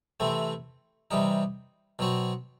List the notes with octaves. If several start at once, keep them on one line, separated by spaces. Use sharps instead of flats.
C3 E3 A3 C4
C3 E3 G3 D#4
B2 F#3 C4 F#4